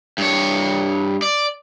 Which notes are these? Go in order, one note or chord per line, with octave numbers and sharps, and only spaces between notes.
G2 C#5
D5